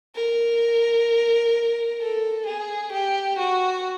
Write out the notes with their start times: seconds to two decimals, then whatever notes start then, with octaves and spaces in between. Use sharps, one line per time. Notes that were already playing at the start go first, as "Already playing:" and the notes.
0.16 A#4
2.01 A4
2.46 G#4
2.93 G4
3.39 F#4